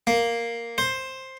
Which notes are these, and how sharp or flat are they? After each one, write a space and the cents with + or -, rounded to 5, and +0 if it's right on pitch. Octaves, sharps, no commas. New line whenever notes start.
A#3 +0
C5 +10